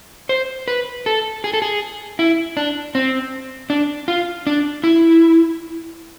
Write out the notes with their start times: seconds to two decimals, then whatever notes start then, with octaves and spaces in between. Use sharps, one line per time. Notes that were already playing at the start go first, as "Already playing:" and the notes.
0.29 C5
0.68 B4
1.06 A4
1.44 G#4
1.54 A4
1.62 G#4
2.19 E4
2.57 D4
2.95 C4
3.70 D4
4.08 F4
4.47 D4
4.84 E4